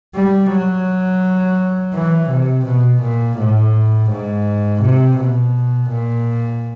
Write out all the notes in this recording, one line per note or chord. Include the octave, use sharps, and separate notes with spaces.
G3
F#3
E3
C3
B2
A#2
A2
G#2
C3
B2
A#2